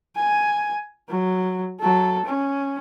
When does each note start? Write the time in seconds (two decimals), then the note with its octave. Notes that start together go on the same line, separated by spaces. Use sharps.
0.16 G#5
1.09 F#3
1.80 F#3 A4
2.25 C#4